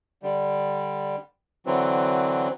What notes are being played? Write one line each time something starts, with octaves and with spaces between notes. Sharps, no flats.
D3 G3
D3 E3 F#3 C4